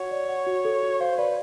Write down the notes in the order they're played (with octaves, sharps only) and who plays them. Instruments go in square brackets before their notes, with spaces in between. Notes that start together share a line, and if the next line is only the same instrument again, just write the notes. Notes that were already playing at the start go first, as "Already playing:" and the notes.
Already playing: [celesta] F#4 F#5 [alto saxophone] C#5
[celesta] D5
F#5
F#4
A4
F#4
[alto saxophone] C5 [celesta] F5
[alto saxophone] B4 [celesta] D5